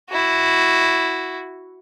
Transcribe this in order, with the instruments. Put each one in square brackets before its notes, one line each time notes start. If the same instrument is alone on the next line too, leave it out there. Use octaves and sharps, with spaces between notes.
[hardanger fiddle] E4 F#4